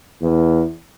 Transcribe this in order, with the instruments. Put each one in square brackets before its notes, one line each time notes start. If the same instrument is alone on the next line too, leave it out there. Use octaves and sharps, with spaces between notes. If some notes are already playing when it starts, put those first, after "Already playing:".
[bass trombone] E2